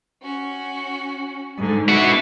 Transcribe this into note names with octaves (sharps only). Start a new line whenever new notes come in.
C#4 F#4
G#2 D3
B3 D4 E4 F#4